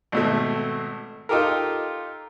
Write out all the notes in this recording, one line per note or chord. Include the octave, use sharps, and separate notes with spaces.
G#1 B2 A3
D#4 F4 G4 A4 A#4